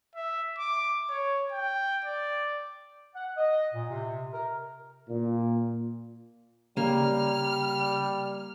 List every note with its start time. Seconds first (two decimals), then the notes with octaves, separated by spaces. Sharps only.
0.15 E5
0.59 D6
1.10 C#5
1.52 G5
2.05 D5
3.15 F#5
3.37 D#5
3.74 A#2
3.89 C3
4.33 A#4
5.09 A#2
6.77 C#3 G3 A#3 G4 F6